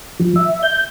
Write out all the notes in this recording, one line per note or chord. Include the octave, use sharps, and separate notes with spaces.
F3
E5
G6